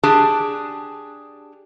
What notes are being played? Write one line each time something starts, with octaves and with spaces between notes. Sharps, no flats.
D4 G4 G#4 A5